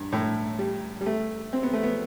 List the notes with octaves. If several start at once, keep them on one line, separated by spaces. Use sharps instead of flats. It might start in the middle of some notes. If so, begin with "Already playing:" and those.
Already playing: G2
A2
G3
G3
A3
C4
B3
A3
B3